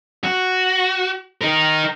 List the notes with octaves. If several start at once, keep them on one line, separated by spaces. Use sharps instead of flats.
F#4
D#4 A#4